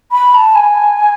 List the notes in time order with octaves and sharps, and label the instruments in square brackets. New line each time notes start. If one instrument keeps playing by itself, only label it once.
[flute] B5
A5
G#5